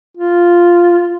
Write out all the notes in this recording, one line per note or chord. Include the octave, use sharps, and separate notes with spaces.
F4